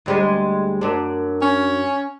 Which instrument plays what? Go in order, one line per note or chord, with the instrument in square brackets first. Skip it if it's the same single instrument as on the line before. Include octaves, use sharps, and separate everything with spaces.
[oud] D2 G3 G#3
F#2 D4
[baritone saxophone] C#4